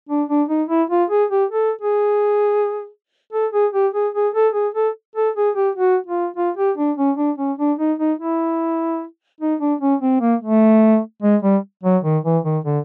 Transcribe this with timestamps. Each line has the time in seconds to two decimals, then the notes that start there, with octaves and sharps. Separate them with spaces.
0.09 D4
0.29 D4
0.49 D#4
0.69 E4
0.90 F4
1.10 G#4
1.31 G4
1.50 A4
1.82 G#4
3.33 A4
3.53 G#4
3.73 G4
3.94 G#4
4.14 G#4
4.34 A4
4.54 G#4
4.75 A4
5.16 A4
5.36 G#4
5.56 G4
5.75 F#4
6.07 F4
6.36 F4
6.57 G4
6.78 D4
6.97 C#4
7.17 D4
7.38 C#4
7.58 D4
7.79 D#4
7.99 D#4
8.19 E4
9.41 D#4
9.60 D4
9.81 C#4
10.02 C4
10.21 A#3
10.42 A3
11.22 G#3
11.43 G3
11.83 F#3
12.04 D#3
12.25 E3
12.44 D#3
12.65 D3